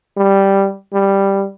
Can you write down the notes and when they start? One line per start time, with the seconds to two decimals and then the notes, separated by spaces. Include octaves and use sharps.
0.17 G3
0.93 G3